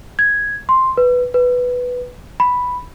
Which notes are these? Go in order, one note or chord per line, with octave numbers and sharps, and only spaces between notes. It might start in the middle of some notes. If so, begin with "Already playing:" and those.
G#6
C6
B4
B4
B5